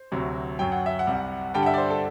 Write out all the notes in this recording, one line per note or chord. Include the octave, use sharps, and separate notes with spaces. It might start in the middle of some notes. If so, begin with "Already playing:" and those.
Already playing: C5
D2 C3 F#3
F#2 F#3 G5
F#5
E5
F#5
C2 C3 G3
G2 D3 G3 G5
F#5
E5
D5
C5
A4